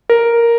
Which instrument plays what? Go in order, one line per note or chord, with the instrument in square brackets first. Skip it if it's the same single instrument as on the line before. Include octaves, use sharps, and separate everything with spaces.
[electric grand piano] A#4